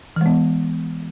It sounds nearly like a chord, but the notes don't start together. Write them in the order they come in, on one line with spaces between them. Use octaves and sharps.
E3 G#3 B3